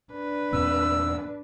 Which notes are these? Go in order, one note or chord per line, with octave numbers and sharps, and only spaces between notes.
D4 B4
E2 A#2 C4 E6